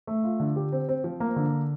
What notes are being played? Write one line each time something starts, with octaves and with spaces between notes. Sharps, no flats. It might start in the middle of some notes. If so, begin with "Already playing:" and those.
A3
F4
D3
G4
C4
C4
F3
A#3
D3